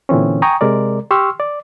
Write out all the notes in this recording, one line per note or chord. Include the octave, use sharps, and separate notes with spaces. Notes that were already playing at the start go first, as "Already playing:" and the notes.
A#2 D3 E3 C4 C#4
G5 G#5 A#5 C#6 D#6
C3 G#3 A#4 D5
G4 C6 C#6 E6 F6
D5